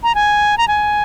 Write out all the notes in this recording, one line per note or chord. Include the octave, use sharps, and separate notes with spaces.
A#5
G#5
A#5
G#5